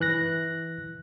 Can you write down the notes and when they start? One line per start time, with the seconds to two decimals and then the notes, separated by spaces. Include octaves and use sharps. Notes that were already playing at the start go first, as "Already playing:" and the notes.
0.01 E3 F#6 A#6